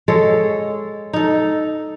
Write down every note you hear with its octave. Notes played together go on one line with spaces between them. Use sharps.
G#3 A4 C#5
D#4 A4